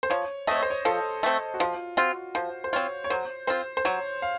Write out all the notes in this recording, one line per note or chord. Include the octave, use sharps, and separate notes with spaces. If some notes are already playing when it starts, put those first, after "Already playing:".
C5
F3 C#5
A3 C4 C#5 D#5
C5
C#5
F3 A4
A3 C4
F#4
F3 F4
C4 F4 F#4
F3 C5
C5
C4 F4 C#5
C#5
F#3 C5
C4 F4 C5
C5
F#3 C#5
F5